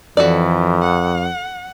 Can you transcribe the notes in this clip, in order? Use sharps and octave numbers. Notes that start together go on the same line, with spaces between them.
F2 E3 F#4 A4 D5
F#5